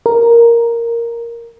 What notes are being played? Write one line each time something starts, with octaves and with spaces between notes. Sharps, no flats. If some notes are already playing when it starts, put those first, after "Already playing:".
A#4